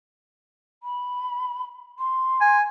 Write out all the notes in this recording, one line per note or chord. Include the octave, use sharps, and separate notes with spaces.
B5
C6
G#5